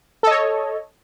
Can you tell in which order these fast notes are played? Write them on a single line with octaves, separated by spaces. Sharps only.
A4 D#5 C#5